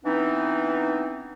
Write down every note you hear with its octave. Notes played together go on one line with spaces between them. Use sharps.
E3 B3 C4 D4 D#4